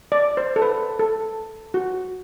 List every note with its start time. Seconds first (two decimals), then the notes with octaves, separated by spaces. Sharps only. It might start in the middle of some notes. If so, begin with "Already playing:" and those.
0.12 D5
0.37 C5
0.56 A4
0.62 B4
0.99 A4
1.74 F#4